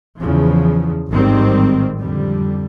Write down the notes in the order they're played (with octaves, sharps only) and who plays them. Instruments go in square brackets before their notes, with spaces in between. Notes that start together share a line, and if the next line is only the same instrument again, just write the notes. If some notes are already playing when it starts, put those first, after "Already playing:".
[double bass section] E2 C#3 F3
A1 G#2 D#3 G3 C4
F2 D3 G3